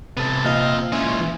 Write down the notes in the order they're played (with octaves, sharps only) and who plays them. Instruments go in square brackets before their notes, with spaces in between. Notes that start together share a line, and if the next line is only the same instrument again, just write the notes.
[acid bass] C3 [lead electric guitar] B3 A4
[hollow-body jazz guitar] A#2 [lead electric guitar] C4 F5 [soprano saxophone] D#5
[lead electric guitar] G#3 E4 [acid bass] C#4 [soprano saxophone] F4
[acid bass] E3